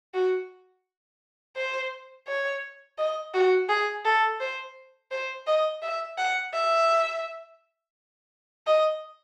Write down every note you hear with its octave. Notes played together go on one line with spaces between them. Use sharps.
F#4
C5
C#5
D#5
F#4
G#4
A4
C5
C5
D#5
E5
F#5
E5
D#5